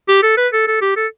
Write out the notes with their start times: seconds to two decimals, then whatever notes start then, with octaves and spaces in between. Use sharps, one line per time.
0.08 G4
0.23 A4
0.37 B4
0.53 A4
0.67 A4
0.81 G4
0.96 A4